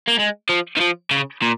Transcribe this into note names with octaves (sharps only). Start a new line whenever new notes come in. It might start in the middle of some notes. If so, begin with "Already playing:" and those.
A#3
G#3
F3
D#3
F3
C#3
A#2